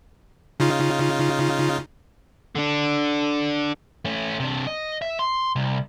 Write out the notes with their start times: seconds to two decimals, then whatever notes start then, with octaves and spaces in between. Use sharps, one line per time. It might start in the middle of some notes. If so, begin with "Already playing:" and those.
0.60 C#3 D#4 F4
2.56 D3 D4
4.05 A3 C#4
4.40 C3 D4
4.67 D#5
5.02 E5
5.19 C6
5.56 C2